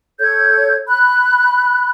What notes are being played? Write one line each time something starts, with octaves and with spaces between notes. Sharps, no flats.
A4 C#5 G6 G#6
B5 F#6